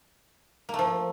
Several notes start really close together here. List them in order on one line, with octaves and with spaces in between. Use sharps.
A#3 A3 F3